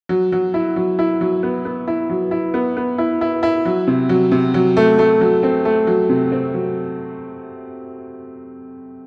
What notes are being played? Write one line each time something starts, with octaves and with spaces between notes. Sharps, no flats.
F#3
F#3
E4
F#3
E4
F#3
B3
B3
E4
F#3
E4
B3
B3
E4
E4
E4
F#3
C3
F#3
C3
F#3
A3
A3
F#3
C4
A3
F#3
C3
C4
F#3